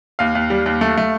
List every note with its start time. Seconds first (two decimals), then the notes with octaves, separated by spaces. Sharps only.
0.19 D#2 F5
0.35 D#2
0.50 G3
0.66 D#2
0.81 A3
0.97 A3